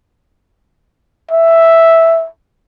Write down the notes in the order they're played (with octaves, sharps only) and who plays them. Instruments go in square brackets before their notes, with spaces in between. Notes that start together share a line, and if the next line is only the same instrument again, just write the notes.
[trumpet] E5